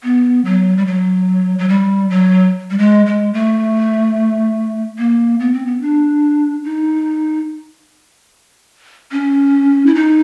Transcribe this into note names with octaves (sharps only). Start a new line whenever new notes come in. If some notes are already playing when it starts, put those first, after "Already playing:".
B3
F#3
G3
F#3
F#3
G3
F#3
G3
G#3
G#3
A3
A#3
B3
C4
B3
D4
D#4
C#4
E4
D#4